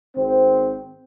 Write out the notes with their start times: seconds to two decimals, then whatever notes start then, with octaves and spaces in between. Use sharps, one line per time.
0.16 G#1 C4 C5